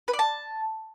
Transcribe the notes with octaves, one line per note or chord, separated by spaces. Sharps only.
B4
D5
A5